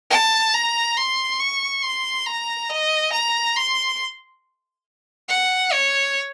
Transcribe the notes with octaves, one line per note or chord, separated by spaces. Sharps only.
A5
A#5
C6
C#6
C6
A#5
D#5
A#5
C6
F#5
C#5